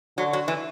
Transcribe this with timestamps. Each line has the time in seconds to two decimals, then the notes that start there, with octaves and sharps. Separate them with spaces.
0.18 D3 F#3
0.33 F#3
0.48 E3